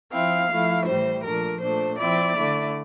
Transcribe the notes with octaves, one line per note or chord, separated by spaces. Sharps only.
F3 C4 E4 F5
F3 A3 E4
A2 E3 G3 C5
A#2 F3 A3 D4 A#4
A#2 A3 D4 C5
F3 C4 E4 D5
D3 A3 E4